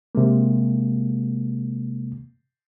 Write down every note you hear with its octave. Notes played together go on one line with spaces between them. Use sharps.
C3 G#3 A#3